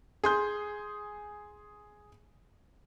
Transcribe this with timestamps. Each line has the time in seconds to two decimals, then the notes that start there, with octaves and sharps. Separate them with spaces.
0.24 G#4 C6 G6